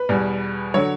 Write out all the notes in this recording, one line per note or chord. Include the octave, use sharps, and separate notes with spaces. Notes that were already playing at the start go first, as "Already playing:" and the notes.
Already playing: B4
E2 B2 G3
D3 F#3 C#5